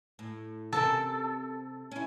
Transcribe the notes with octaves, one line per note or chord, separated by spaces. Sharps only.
A2
C3 C4 A4 A#4
C#4 E4